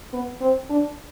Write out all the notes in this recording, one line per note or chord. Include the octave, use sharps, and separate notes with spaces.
B3
C4
D4